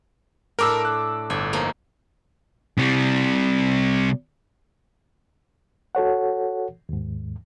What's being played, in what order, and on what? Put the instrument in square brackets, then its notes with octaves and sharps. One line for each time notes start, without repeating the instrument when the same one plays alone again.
[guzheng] A2 D4 G5 [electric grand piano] A#4 D6 E6
[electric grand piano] F#6
[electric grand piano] G1 [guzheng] E5
[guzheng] F3 A#3 D#4
[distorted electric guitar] C3 G3
[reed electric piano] F#4 A4 C#5 F#5
D#2 G#2